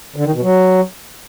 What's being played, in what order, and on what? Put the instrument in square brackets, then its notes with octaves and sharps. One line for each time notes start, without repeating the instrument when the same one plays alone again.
[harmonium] D3
D#3
B2
F#3